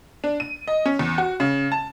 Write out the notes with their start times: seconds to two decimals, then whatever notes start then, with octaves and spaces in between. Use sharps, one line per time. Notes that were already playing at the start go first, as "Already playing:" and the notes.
0.24 D4
0.40 D#7
0.68 D#5
0.86 C#4
0.99 E2
1.18 F#4
1.40 C#3
1.72 A5